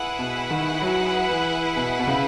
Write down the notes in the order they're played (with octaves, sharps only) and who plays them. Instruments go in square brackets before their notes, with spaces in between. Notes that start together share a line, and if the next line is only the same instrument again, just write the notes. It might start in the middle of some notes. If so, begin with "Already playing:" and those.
Already playing: [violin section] E4 G#4 B4 F#5
[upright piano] B2
D#3
F#3
E3
B2
B2
C#3